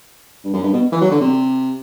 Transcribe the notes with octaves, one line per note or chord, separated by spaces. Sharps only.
G2
F#2
G2
B2
E3
F#3
D3
C3